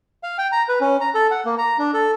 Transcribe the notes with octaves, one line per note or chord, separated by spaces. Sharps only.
F5
G5
A#5
B4
C#4
A#5
A4
F#5
A#3
A#5
D4
A4